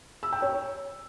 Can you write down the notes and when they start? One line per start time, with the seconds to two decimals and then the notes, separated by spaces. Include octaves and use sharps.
0.23 E6
0.33 G5
0.42 C#5